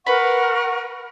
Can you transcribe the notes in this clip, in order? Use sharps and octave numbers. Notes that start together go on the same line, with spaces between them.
A#4 B4 F#5 B5 C#6